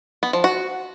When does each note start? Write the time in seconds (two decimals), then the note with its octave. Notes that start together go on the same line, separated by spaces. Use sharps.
0.23 B3
0.33 F3
0.44 F#4